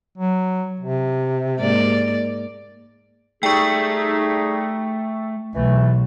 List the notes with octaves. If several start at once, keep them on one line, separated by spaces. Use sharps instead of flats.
F#3
C3
G#2 A#3 D5
G3 A3 D#4 G#4 G5 C#6
B1 E3 A3